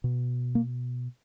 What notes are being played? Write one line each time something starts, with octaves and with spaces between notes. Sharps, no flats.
B2
A#3